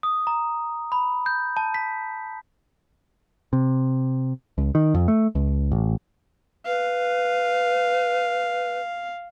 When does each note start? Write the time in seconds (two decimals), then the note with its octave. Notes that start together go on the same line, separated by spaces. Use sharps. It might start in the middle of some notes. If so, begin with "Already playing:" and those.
0.03 D#6
0.27 A#5
0.92 B5
1.26 G6
1.57 A5
1.74 B6
3.53 C3
4.58 C#2
4.75 D#3
4.94 F2
5.08 A3
5.35 C#2
5.72 A1
6.66 B4 F5